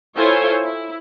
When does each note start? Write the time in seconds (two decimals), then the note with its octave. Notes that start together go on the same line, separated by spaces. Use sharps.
0.16 E4 F4 A4 C5 C#5 G#5
0.63 E4